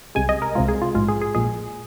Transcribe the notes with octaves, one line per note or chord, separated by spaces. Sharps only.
C2 C3 G#3 G#5
D#5
A#4
C2 C3 G#3 F4
G#4
F4
A#1 G#2 G#3 F4
G#4
G#4
A#1 A#2 G#3 G#4